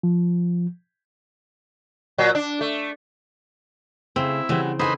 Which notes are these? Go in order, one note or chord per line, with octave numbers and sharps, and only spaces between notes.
F3
A#2 F#3
D4
A3
C#3 A3 C4 E4
C#3 E3 G3 C4 F#4
D#4 E4 A4 B4 C5 F#5 G#5